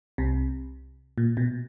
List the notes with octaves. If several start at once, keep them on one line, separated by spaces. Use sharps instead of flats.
C2 C3
A#2
B2